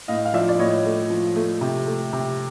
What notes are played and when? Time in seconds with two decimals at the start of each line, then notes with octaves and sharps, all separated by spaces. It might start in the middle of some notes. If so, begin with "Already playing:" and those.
0.08 A2 D#5 F5
0.25 F5
0.34 F3 D5 E5
0.49 D5
0.59 A2 C#5 D#5
0.85 A3
1.10 F3
1.36 A3
1.61 C3
1.87 A3
2.13 C3